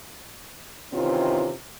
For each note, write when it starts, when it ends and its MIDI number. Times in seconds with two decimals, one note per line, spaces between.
0.93 1.54 48
0.93 1.54 51
0.93 1.54 52
0.93 1.54 60
0.93 1.54 61
0.93 1.54 65